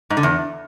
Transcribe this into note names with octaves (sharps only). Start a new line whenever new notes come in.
G#2
D3
E2